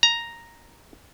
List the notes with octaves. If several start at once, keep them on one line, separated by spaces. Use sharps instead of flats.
A#5